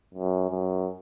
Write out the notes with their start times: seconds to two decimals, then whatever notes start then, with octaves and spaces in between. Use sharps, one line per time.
0.14 F#2
0.50 F#2